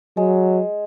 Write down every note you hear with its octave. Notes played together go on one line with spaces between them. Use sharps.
F#3 G#3